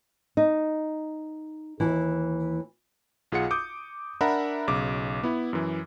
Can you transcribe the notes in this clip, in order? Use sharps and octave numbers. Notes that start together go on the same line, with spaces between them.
D#4
D#2 G#2 E3
B1 F4 G#4 F5 F#5 C#7
D6 D#6 G6
D4 A#4 E5 F#5 A#5 B5
B1 C#3 D6
B3 E4
F#2 E3